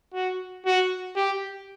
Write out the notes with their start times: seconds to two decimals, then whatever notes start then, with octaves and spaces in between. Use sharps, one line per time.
0.14 F#4
0.66 F#4
1.16 G4